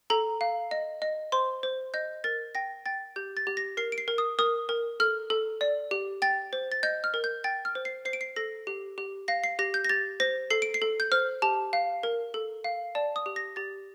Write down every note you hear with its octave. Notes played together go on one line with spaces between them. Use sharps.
A4 A#5
F5
D#5
D#5
C5 C6
C5
D#5 G6
A#4 A6
G5 A#6
G5 A6
G4 G6
A6
G4
A#6
A#4 C7
D7
C7
A#4
D#6
A#4 D#6
A#4
A4 F6
A4
D5
G4
G5 A6
C5
A6
D#5 G6
F6
A#4
G6
G5 A6
F6
C5
C7
C5 C7
D7
C7
A4 A#6
G4
G4
F5 A#6
C7
G4 A#6
G6
A#6
G4 A6
C5 A#6
A4 C7
D7
C7
A4
G6
C5 F6
G4 A5
F5
A#4
A4
F5
D5 A5
D#6
G4
A#6
G4 A6